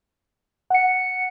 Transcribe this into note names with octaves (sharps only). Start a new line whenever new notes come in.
F#5 C#7